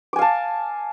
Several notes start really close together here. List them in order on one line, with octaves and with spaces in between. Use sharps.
D6 G#5 F5 A5